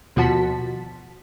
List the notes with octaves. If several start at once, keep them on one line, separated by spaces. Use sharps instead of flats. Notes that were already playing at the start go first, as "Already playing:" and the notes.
D#2 B2 F3 F#4 A5 B6